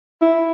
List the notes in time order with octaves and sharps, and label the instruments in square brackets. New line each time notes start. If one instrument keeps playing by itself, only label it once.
[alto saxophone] E4